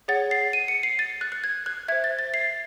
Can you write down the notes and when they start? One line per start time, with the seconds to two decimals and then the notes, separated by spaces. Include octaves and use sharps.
0.08 G#4 C#5 F#5 A6
0.31 C7
0.53 D#7
0.68 C#7
0.83 C7
0.99 A6
1.21 F#6
1.32 F#6
1.44 G#6
1.66 F#6
1.88 C5 E5 G#6
2.04 A6
2.19 A6
2.34 C7